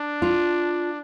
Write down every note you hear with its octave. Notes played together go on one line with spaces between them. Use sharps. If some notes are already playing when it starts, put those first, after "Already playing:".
Already playing: D4
F4